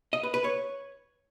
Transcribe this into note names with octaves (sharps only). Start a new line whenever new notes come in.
D#5
B4
B4
C#5